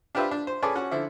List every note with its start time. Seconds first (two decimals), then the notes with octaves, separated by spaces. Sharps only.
0.15 D4 F4 G4 B4 C5 E5
0.31 D4
0.47 C5
0.62 C#4 G#4 A4 B4 D5
0.75 C#4 F#4
0.91 D3 F3 E4